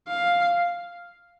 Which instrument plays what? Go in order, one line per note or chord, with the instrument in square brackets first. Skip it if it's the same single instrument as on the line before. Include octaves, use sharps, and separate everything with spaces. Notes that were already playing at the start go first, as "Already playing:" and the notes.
[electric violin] F5